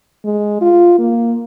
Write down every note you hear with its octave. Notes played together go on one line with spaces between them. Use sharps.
G#3
F4
A#3